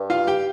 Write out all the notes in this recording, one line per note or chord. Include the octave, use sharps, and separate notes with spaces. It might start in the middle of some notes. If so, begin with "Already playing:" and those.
Already playing: G2
F4 F5
G4 G5